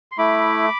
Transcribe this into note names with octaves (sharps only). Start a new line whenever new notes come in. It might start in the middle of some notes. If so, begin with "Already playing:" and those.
C6
A3 E4 B5 D6